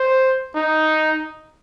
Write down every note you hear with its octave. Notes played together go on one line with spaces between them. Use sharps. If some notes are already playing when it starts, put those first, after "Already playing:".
Already playing: C5
D#4